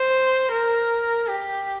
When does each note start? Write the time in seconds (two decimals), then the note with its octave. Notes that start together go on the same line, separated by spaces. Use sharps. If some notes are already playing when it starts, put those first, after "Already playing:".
Already playing: C5
0.52 A#4
1.29 G4